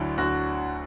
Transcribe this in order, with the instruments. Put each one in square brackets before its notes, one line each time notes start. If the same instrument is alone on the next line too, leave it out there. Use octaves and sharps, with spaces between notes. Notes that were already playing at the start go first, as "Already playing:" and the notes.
Already playing: [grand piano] D2 D3 F#3 D4 E4
D2 F#4